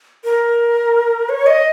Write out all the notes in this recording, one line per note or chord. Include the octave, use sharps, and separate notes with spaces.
A#4
C#5
D#5